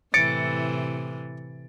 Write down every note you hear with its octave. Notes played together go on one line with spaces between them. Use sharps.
A2 C3 E3 A6 C#7 D7